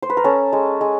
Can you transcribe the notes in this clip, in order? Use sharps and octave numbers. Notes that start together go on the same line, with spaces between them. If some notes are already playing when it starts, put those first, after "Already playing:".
C5
B4
A#4
C#4 A4
G#3
G#3